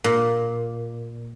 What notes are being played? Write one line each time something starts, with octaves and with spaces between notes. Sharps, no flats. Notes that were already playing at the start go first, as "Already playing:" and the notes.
A#2